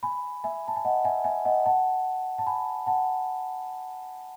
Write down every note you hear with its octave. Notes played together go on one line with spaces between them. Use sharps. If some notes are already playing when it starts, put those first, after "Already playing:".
G#5 B5
E5 G#5
A5
G#5
D#5 F#5
E5 G#5
E5 G#5
D#5 F#5
F#5 A5
A5
G#5 B5
F#5 A5